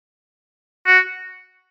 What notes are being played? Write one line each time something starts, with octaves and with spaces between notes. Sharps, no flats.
F#4